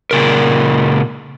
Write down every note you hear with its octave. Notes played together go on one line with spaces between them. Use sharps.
A#2 C#3 A#4